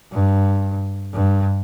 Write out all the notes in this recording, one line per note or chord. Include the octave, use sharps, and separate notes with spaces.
G2
G2